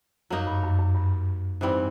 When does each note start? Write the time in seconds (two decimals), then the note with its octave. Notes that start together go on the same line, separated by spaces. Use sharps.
0.30 F#2 F#3 A#3 D#4
0.47 G2
0.64 F#2
0.79 F#2
0.95 G2
1.61 G#2 E3 G3 C4